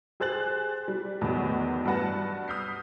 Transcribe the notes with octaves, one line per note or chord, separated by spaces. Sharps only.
G4 G#4 C5 F#6 A6 F#7
G3
E2 A2 D#3 F#3
G2 F#3 B4 F#5 A5 A#6
D#6 F6 G6 B6 C7